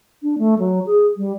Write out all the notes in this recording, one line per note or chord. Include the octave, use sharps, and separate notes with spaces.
D4
A3
F#3
G#4
G3